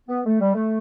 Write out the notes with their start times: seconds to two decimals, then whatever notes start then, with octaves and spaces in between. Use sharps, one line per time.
0.09 B3
0.26 A3
0.40 G3
0.54 A3